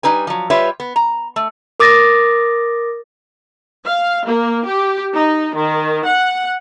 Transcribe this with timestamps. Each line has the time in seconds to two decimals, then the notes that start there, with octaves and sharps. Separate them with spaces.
0.03 G3 D#4 B4 G#5
0.27 F3 F#3
0.50 G3 F4 B4 C#5 E5
0.80 B3
0.96 A#5
1.36 A3
1.80 A#4 D6 D#6 A6 A#6
3.85 F5
4.26 A#3
4.66 G4
5.15 D#4
5.55 D#3
6.06 F#5